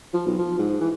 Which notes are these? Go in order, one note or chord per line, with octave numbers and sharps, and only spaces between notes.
F3
B1
F3
G#2
E3